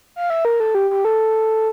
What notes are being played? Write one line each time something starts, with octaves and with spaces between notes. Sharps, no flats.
F5
E5
A#4
A4
G4
G4
A4